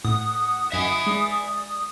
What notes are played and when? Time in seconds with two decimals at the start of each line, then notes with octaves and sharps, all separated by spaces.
0.05 A2 F#5 D#6
0.72 F#2 D#5 E5 G#5
1.07 G#3 D5